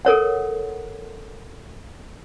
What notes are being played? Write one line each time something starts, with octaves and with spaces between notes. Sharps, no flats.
A4 A#4 C#5 F#5